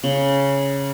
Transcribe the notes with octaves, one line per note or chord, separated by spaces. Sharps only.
C#3